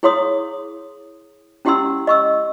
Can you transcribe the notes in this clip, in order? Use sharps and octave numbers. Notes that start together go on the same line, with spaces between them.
E4 G#4 C#5 F5 C6 D#6
C#4 E4 G4 F#5 C6 E6
D#5 C#6 E6